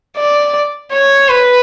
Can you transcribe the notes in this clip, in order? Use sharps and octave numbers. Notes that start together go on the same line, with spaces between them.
D5
C#5
B4